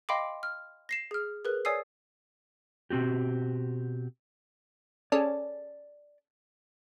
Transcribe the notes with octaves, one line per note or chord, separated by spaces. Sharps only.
D#5 F5 G5 B5 C6 D6
F6
A#6 C7 E7
G#4 F6
G#4 A#4 B4 F#6
C#5 D5 G#5 D#6 E6 C7
B2 C4 F#4 G4
C#4 G#4 A4 D5